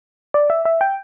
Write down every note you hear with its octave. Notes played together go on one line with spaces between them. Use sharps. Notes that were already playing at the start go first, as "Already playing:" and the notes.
D5
E5
E5
G5